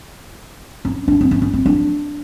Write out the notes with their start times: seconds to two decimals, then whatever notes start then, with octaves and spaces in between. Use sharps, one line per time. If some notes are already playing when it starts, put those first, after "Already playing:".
0.85 C#4
1.08 D4
1.21 C4
1.31 C#4
1.42 C#4
1.54 C4
1.66 D4